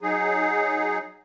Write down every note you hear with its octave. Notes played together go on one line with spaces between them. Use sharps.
F#3 D#4 G#4